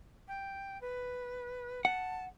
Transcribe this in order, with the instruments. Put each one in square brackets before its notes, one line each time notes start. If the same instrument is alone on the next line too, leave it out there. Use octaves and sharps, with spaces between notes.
[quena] G5
B4
[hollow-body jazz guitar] F#5 [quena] A5